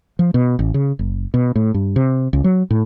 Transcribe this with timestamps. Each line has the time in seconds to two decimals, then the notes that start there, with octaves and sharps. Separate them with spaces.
0.19 F3
0.34 B2
0.59 A1
0.74 C#3
0.99 F#1
1.34 B2
1.56 A2
1.74 G2
1.96 C3
2.33 C#2
2.44 F#3
2.70 A2